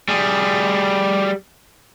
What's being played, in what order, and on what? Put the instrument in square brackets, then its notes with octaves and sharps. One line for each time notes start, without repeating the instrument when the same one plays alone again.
[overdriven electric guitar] G3 G#4